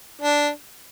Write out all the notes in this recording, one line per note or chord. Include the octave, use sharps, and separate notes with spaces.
D4